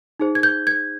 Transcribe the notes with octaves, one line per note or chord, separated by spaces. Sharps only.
D#4 G#4 C5
G#6
G6
G#6